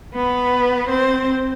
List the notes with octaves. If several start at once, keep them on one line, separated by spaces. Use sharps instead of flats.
B3 B4
C4 C5